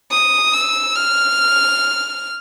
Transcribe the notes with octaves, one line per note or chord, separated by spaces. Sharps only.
D#6
E6
F6